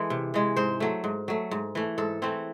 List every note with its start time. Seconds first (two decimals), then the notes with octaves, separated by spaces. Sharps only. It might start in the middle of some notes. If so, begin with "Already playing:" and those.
Already playing: E3 G#3 A4
0.10 C3
0.34 E3 G#3
0.56 G#2 C5
0.80 F#3 A3
1.04 G#2
1.28 F#3 A3
1.51 G#2
1.75 E3 A3
1.98 G#2 A4
2.22 E3 A3 C4